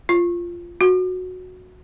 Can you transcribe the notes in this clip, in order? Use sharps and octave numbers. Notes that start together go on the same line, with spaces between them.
F4
F#4